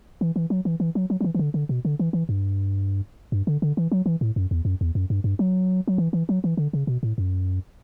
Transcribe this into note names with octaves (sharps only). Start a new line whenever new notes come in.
E3
E3
F#3
E3
E3
F#3
F#3
F#3
E3
E3
D3
D3
B2
D3
E3
E3
G2
G2
D3
D3
E3
F#3
E3
A2
F#2
E2
F#2
E2
F#2
G2
G2
F#3
F#3
E3
E3
F#3
E3
D3
C#3
B2
A2
F#2